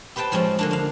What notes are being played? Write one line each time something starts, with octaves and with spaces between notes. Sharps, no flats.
G4 B4 C5 G5 A5
F3 G#3 C4 C#4
D3 A#3 D4
D4 F5